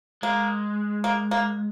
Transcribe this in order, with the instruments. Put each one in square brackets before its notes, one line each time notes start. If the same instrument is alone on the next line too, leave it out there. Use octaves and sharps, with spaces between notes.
[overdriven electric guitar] G#3 [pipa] A#3
[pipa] A#3
A#3